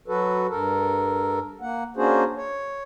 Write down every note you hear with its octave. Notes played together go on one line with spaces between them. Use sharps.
F#3 F#4 A4 B4
G2 A4 A#4
A#3 F#5
A#3 C#4 D4 F#4 G#4 C5
C#5